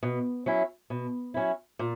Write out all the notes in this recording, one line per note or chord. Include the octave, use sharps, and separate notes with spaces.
B2
F#3 C#4 E4
B2
F#3 C#4 E4
A#2